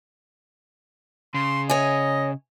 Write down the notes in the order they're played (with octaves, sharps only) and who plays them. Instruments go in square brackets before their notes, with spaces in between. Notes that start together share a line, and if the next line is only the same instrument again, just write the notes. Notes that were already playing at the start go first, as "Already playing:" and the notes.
[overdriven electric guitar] C#3 [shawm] C6
[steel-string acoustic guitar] C#5 G#5 [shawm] D#5